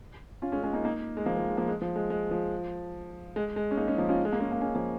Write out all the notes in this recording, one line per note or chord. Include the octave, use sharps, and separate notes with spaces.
C#4 F4
G#3 C#4
G#3 C#4
A#3 D#4
A#3 D#4
G#3
F3 A#3
F3
G#3
F3 A#3
G#3
F3
G#3
G#3
F3
G#3
G#3
C#4
A#3 D#4
G#3 C#4
F3 A#3
C#4 F4
G#3
A#3
G#3 C#4
A#3
G#3 C#4
F3 A#3